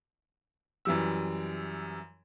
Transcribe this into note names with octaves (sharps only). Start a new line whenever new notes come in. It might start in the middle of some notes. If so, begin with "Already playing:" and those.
F#2 E3 G3 E6